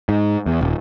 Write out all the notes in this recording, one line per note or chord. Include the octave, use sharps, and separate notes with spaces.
G#2
E2
D#1